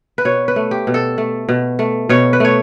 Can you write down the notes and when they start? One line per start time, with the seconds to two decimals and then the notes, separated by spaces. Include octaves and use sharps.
0.18 B4
0.25 B2 C#5
0.48 B4
0.56 A3
0.71 G4
0.87 B2
0.94 A4
1.18 A3
1.49 B2
1.79 A3
2.09 B2 C#5
2.33 B4
2.40 A3 C#5